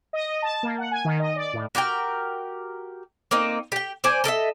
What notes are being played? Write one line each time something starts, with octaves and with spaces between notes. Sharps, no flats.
D#5
A5
A#3
F#5
G#5
D#3
D#5
D5
A2
F#4 G4 A#4 G5
A#3 C4 D#4
G4 G5
C5 D5 G#5
A4 A#4 D#5 E5